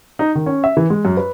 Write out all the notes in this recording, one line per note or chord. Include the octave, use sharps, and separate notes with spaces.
D#4
D#3
C#4
E5
E3
G#3
F#2
B4